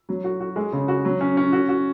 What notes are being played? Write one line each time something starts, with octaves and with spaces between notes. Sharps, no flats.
F#3
F#4
F#4
G#3
C#3
F#4
F#3
C#4
C#4
F#4
F#4